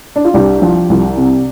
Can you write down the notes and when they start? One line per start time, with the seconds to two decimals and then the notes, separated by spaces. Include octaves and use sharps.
0.16 D4
0.25 F4
0.34 C2 D4 G4
0.62 F3
0.90 C2
1.18 C3